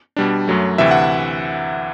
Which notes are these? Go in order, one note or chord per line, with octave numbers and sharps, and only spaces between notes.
B2 G3 D4
F#2 F#3 A3
D2 C3 E3 E5
F#5